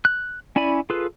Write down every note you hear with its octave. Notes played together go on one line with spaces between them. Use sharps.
F#6
C#4 E4 D5 G#5 B5
F4 G#4 A4 B4